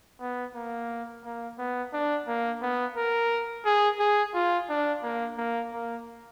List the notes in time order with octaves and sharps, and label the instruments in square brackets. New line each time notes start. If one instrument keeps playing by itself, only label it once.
[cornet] B3
A#3
A#3
B3
D4
A#3
B3
A#4
G#4
G#4
F4
D4
A#3
A#3
A#3